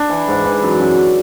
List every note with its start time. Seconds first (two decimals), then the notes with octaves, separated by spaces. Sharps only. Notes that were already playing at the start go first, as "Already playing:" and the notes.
Already playing: D4
0.10 E3
0.28 G#2
0.45 E3
0.62 F#2
0.80 F#2